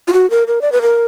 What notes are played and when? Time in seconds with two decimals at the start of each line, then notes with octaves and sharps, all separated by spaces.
0.08 F4
0.13 F#4
0.30 A#4
0.47 A#4
0.61 D5
0.72 B4
0.82 A#4